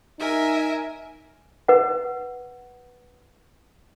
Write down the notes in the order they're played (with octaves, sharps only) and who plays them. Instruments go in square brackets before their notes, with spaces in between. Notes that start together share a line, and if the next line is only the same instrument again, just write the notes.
[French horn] D#4 [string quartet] A#4 E5 G#5
[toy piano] B4 F#5